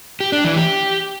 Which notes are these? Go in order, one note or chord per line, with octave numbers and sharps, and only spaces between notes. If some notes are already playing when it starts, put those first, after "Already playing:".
G4
D4
E3
G4